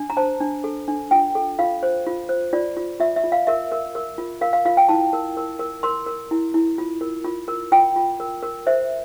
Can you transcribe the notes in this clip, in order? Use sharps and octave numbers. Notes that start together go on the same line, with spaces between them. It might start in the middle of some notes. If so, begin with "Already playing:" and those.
Already playing: D4
A#5
C5 A5
D4
A4
D4
F4 G5
A4
F4 F5
C5
F4
C5
F4 D5
F4
F4 E5
E5
F4
F5
A#4 E5
A#4
A#4
F4
A#4 F5
F5
F4 F5
G5
E4 A5
A#4
A#4
A#4
A#4 C6
A#4
E4
E4
F4
A#4
F4
A#4
F4 G5
F4
A#4
A#4
C5 E5